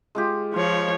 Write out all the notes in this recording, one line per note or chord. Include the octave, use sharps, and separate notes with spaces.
G#3 F4 G4
F3 F4 C#5